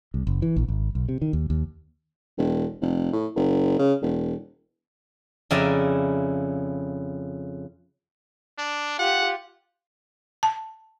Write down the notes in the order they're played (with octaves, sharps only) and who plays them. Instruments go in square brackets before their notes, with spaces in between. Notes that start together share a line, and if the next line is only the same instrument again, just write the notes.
[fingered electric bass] C2
F#1
E3
A#1
G#1
B1
C3
D#3
D#2
D#2
[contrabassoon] E1
F1
A2
F#1
C#3
E1
[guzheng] F2 C#3 E4 D5 G#5 A#5
[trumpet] D4
[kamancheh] F4 G4 [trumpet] F#5
[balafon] A5